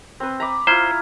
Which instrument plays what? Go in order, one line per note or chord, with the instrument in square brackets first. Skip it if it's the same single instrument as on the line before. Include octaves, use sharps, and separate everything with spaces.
[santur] C4 B4
A#5 B5 D6
[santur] E4 F4 [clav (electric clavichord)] C5 [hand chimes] A#5 F6 G#6